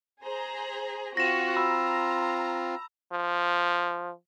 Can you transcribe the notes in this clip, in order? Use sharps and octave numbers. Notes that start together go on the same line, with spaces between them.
G#4 C5 A#5
C4 F4 F#4 A#6 E7
A#5 B5 E6
F3